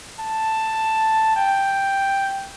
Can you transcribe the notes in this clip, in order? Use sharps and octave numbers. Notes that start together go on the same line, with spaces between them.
A5
G5